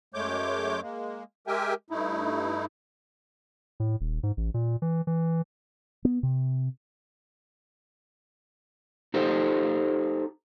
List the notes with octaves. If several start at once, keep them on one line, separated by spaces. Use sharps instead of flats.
F#2 G#3 A3 C#5 D6 G6
G#3 A#3
G#3 G4 A#4 E5 G5 G#5
G2 A3 D#4 E4
A2
D#1
G#2
A1
A#2
E3
E3
B3
C3
D#4 G4 A4 C5